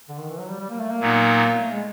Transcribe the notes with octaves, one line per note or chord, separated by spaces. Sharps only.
D3
D#3
E3
F#3
G3
G3
A#3
A3
A#3
A#2 F#3 B3 D#4
A3
G#3